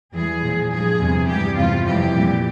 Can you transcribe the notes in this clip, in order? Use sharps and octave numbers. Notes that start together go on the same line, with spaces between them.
E2 E3 G3 G#4
A#2 F3
G2 F3 G#4
E2 C3 G3
G2 E3 G3 G4
E2 C3 G3 F4
F2 C3 E3 G3 G4
A#2 G3